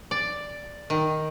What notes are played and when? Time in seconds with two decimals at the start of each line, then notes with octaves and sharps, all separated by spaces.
0.11 D5
0.90 D#3